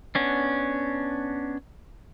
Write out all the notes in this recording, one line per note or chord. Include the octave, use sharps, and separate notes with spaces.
B3 C#4 D4